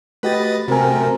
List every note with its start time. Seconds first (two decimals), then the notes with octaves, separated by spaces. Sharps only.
0.23 A3 F#4 G4 B4 D#5 A6
0.68 F#2 C3 A3 C4 F#4 A#4 G#5